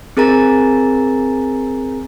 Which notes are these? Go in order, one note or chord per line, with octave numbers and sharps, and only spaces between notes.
C4 G#4 A#4 G#5 A#5 A6